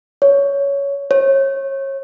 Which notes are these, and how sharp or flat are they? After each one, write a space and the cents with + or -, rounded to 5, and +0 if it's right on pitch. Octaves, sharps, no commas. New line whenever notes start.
C#5 +15
C#5 -30